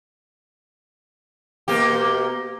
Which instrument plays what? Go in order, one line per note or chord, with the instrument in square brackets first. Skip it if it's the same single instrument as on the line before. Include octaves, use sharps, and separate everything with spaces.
[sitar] B2 A#3 G4